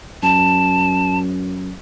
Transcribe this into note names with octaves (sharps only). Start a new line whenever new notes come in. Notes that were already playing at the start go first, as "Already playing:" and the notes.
F#2 A5